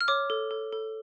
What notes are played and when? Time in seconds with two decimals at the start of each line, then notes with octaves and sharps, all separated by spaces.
0.01 F6
0.08 C#5 D6
0.30 A4
0.51 A4
0.73 A4